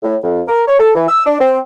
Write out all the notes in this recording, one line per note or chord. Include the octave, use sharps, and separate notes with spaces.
A2
F2
A#4
C#5
A4
E3
E6
D4
C4